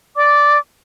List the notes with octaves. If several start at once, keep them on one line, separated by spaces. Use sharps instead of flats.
D5 D6